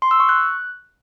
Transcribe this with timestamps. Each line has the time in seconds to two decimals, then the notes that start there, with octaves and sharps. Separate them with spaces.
0.02 C6
0.11 E6
0.20 C#6
0.29 F#6